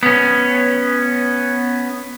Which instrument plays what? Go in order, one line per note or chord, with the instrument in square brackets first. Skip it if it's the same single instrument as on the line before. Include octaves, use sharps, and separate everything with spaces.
[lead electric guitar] B3 C#4